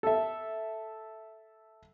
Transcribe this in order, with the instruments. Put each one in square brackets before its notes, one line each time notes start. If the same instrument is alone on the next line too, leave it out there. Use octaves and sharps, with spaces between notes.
[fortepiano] A4 E5